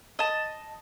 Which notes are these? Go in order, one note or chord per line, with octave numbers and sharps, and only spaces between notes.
D#5 A5